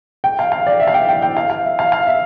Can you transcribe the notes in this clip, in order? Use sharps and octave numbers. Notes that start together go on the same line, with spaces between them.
G5
F5
F5
D5
E5
F5
G5
G5
G5
F5
F5
E5
F5
F5
E5